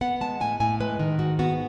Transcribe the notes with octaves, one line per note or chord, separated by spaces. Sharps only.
B3 F#5
G#3 A5
A2 G#5
A2 G#5
G#3 B4
D#3
G#2 F#4
B3 F#4